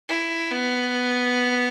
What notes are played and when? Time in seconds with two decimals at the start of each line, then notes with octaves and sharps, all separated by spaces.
0.09 E4
0.51 B3